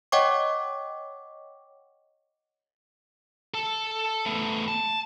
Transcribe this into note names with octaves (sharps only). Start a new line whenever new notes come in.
C#5 D#5 F#5 G5 C#6 D6
A4 A5
A3 B3
A5